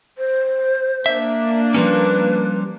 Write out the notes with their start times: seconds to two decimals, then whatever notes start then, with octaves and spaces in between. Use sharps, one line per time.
0.18 C5
1.06 A#3 D4 E5
1.74 F3 G3 C#4 B4